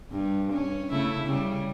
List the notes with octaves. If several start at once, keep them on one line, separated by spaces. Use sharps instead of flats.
G2
C#4
C#3 A3 E4
C#3 G3